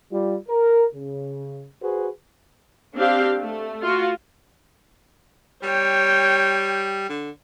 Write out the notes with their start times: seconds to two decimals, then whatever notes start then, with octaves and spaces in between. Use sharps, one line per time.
0.12 G3 F4
0.49 A#4
0.94 C#3
1.82 F#4 G#4 B4 C5
2.95 C4 D4 G4 F5
3.37 A3
3.82 F4 F#4
5.63 G3 C#5 G5
7.09 D3